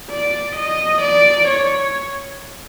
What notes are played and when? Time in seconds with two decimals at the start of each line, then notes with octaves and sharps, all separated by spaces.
0.10 D5
0.56 D#5
1.02 D5
1.48 C#5